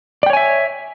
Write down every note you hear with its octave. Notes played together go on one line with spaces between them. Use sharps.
C#5 D5 E5 G5 G#5